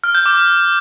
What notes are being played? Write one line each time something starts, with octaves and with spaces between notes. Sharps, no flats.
F6
G6
D6